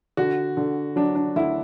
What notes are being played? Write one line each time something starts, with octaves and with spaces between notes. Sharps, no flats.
D3 F#4
D3
F#3 D4
D4
D2 E4